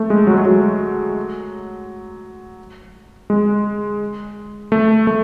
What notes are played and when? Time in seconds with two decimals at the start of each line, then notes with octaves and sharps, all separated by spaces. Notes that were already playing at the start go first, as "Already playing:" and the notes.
Already playing: A3
0.10 G#3
0.27 F#3
0.38 G#3
0.45 F#3
3.30 G#3
4.72 A3
5.07 A3